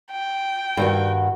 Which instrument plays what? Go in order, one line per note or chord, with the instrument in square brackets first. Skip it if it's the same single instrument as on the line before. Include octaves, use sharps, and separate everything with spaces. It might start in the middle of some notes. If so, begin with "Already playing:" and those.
[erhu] G5
[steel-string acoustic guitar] G2 D#3 F#4